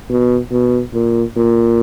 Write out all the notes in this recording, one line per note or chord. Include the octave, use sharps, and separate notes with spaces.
B2
B2
A#2
A#2